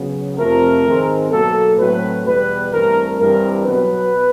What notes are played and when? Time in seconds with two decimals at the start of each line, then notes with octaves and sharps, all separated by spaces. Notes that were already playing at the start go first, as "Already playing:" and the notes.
Already playing: C#3 F#3 B3
0.38 F2 C3 F3 A3 C4 A#4
0.85 G#2 D#3 G#3 C4
1.31 B2 F#3 A#3 A4
1.78 A2 F#3 A3 C4 B4
2.25 E2 B2 G3 B3 B4
2.72 G2 E3 A3 C4 A#4
3.19 G2 E3 G3 C4 A#4
3.66 B2 F#3 B3 B4